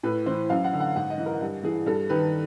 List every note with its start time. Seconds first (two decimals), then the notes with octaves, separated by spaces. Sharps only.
0.03 A2 B4
0.26 E3 C5
0.50 F#2 F5
0.64 F#5
0.73 D3
0.80 F#5
0.96 G#2 F#5
1.10 D#5
1.18 E3
1.26 A#4
1.41 G2
1.63 E3 G#4
1.86 G2 A4
2.09 D#3 B4